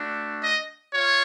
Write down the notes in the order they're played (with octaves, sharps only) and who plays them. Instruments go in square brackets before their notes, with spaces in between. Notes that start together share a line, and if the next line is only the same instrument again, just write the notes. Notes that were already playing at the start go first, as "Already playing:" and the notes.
Already playing: [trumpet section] A3 D4 F#4
D#5
F4 C#5